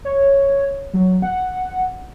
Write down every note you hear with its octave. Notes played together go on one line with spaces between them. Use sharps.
C#5
F#3
F#5